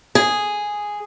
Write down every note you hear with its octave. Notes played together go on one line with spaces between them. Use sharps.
G#4